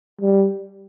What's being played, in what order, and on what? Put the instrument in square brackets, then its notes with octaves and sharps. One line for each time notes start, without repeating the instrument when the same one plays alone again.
[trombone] G3